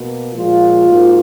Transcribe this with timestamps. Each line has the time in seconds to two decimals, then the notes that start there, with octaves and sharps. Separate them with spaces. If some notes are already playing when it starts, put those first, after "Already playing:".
Already playing: B2 A#3
0.34 A#2 F3 G#3 F4
0.87 G#2 F#3 A#3